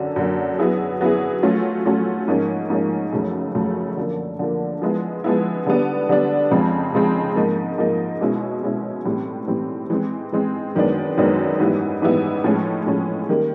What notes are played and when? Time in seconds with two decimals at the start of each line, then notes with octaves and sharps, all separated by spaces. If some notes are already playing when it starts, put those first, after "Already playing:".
Already playing: F#2 D3 F#3
0.16 F#2 D3 F#3 A#3
0.58 F#3 B3 E4 G#4
1.01 F#3 B3 E4 G#4
1.43 F#3 A3 C#4 F4
1.85 F#3 A3 C#4 F4
2.28 G#2 F3 A#3 C#4
2.70 G#2 F3 A#3 C#4
3.12 F#2 C#3 F3 A3
3.55 F#2 C#3 F3 A3
3.97 D3 F3 A#3
4.39 D3 F3 A#3
4.82 F3 G#3 B3 E4
5.24 F3 G#3 B3 E4
5.67 D3 G3 B3 D4
6.09 D3 G3 B3 D4
6.51 F2 C#3 F3 G#3 C4
6.93 F2 C#3 F3 G#3 C4
7.36 G#2 F3 A#3 D#4
7.78 G#2 F3 A#3 D#4
8.21 B2 G#3 C#4 E4
8.63 B2 G#3 C#4 E4
9.05 A2 E3 G3 C4
9.48 A2 E3 G3 C4
9.90 E3 G#3 C4
10.32 E3 G#3 C4
10.75 F#2 D#3 G#3 B3 D4
11.17 F#2 D#3 G#3 B3 D4
11.60 G#2 E3 G3 B3 E4
12.02 G#2 E3 G3 B3 E4
12.44 A2 F3 G#3 C#4
12.86 A2 F3 G#3 C#4
13.29 D#3 G3 A#3